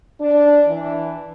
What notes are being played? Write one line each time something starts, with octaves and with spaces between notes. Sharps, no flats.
D4
E3